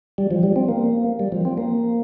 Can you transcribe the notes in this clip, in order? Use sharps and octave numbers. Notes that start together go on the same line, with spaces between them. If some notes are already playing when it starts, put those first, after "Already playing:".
G3
F3
G3
C4
A#3
G3
F3
C4
A#3